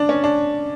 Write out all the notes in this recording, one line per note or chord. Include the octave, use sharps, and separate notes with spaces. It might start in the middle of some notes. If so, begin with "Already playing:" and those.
Already playing: D4
C#4
D4